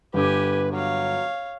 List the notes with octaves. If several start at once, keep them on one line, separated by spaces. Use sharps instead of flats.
G1 D3 G4 B4 G#5 D6
F#3 C#5 F5